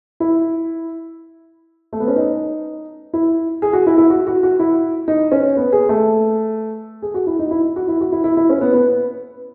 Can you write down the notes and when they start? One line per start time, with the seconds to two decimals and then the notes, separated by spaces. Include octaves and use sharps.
0.20 E4
1.93 A3
2.00 B3
2.08 C#4
2.16 D#4
3.13 E4
3.62 G#4
3.73 F#4
3.87 E4
3.98 E4
4.10 F#4
4.27 F#4
4.43 F#4
4.59 E4
5.08 D#4
5.32 C#4
5.57 B3
5.72 G#4
5.89 A3
7.02 G#4
7.14 F#4
7.27 E4
7.39 D#4
7.51 E4
7.76 F#4
7.88 E4
8.01 F#4
8.12 E4
8.24 E4
8.37 E4
8.49 C#4
8.61 B3
8.73 B3